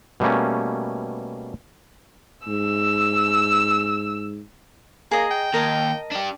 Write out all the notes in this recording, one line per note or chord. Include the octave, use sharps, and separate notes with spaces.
B2 G3 A3 A#3 C#4
G#2 E6
A#3 G#4 D#5 A#5
G5
D#2 A#4 D#5 A5
D4 G4